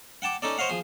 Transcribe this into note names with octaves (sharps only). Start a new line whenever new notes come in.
F#5 G5 A5 D6
C#4 D#4 A4 D5
C5 C#5 D#5 F5 F#5
F3 G#4